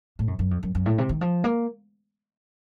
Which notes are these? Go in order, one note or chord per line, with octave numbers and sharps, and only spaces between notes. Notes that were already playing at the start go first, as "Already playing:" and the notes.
A2
F#2
F#2
F2
F#2
F#2
A2
C3
D#3
F3
A#3